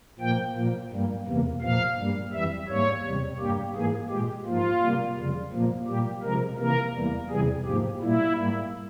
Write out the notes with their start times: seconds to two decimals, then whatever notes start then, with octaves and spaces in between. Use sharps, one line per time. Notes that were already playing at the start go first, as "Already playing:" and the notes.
0.19 A#2 F3 A#3 G5
0.55 A#2 F3 A#3
0.91 G2 G3 A#3
1.26 E2 C3 E3 A#3
1.61 A#2 F3 A#3 F5
1.97 G2 G3 A#3
2.33 F2 E3 G3 E5
2.68 G#2 G3 A#3 C#5
3.03 E2 C3 G3
3.39 G2 G3 A#3 G4
3.75 G#2 E3 A#3 G#4
4.09 A#2 G#3 G4
4.46 G#2 F3 A#3 F4
4.81 C3 G3 A#3
5.17 F2 C#3 G3
5.52 A#2 F3 A#3
5.88 A#2 G3 A#3 G4
6.23 C3 F3 G#3 A#4
6.58 C3 E3 A#3 A#4
6.94 E2 E3 G3 A#3
7.30 E2 C3 E3 G3 G#4
7.65 G#2 F3 A#3 G4
8.01 A#2 G3 A#3 E4
8.36 G#2 G3 A#3